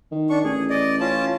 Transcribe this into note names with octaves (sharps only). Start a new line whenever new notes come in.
D#3
D4 C#6
A1 G#4
D5 D#5
C#4 F4 A5